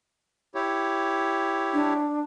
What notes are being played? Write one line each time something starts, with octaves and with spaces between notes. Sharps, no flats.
E4 G4 C#5
D4